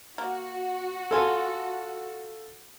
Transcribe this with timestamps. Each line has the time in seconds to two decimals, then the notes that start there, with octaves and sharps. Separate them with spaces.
0.18 A#3 F#4
1.11 C#4 F4 A4 G#5